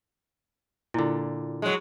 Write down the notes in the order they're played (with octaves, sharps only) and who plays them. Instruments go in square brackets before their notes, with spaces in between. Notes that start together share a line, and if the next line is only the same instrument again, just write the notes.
[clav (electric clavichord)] A#2 D3 [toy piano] E4 D#5
[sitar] F#3 G#3